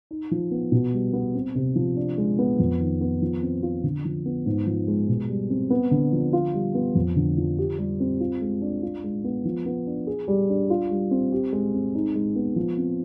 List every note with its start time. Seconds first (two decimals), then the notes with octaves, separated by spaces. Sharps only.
0.11 D#4
0.31 F3
0.51 B3
0.72 B2
0.93 G3
1.13 B3
1.35 C4
1.55 C3
1.76 F3
1.96 D4
2.18 G#3
2.39 B3
2.59 F2
2.80 D#3
3.01 B3
3.22 F3
3.43 C4
3.63 F4
3.84 D3
4.05 F3
4.26 B3
4.46 G#2
4.67 F3
4.88 G#3
5.09 B2
5.29 G3
5.50 C4
5.70 B3
5.91 D3
6.13 F3
6.33 F4
6.54 G3
6.75 B3
6.95 F2
7.16 D3
7.37 F3
7.59 G4
7.78 G3
8.00 C4
8.20 F4
8.42 G#3
8.62 D4
8.83 F4
9.04 G#3
9.24 B3
9.45 F3
9.66 B3
9.87 D4
10.07 G#4
10.28 G3
10.49 D4
10.70 F4
10.91 G3
11.11 C4
11.32 G4
11.53 G#3
11.74 C4
11.95 D#4
12.15 G#3
12.36 B3
12.56 F3
12.77 C4